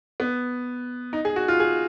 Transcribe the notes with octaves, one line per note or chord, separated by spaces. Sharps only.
B3
D#4
G#4
F#4
F4
G#4